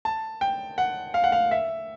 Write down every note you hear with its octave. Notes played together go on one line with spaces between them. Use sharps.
A5
G5
F#5
F5
F#5
F5
E5